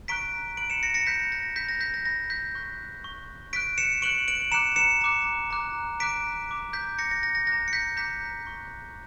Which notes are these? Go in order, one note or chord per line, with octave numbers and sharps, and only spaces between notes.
A#5 C#6 F#6 B6 D7
B5 F#6 D7 F#7
C#7 E7
A#6 C#7
A#6 C#7
B5 F#6 G6 B6
A#6
B5 F#6 G6 B6
A#6
G6 B6
A#6
B5 F#6 A#6
G6 B6
C#6 F#6
C#6 F#6
C#6 F#6 B6 D7
C#7 E7
C#6 F#6 D7 F#7
D7 F#7
A#5 D6 F#6 C#7 E7
C#7 E7
A#5 D6 F#6
A#5 D6 F#6
A#5 D6 F#6 B6 D7
A#5 D6 F#6
G6 B6
A#5 D6 F#6 A#6 C#7
A#6
A#6
A#6
A#5 D6 F#6 A#6
C#7
G6 B6
A#5 D6 F#6 G6 B6
C#6 F#6